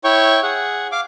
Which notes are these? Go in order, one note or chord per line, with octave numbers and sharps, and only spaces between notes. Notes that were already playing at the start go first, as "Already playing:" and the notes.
E4 C#5 G5 C#6
G#4 F#5
F5 D6